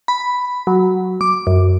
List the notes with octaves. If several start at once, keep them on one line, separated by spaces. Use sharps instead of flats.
B5
F#3
D6
F#2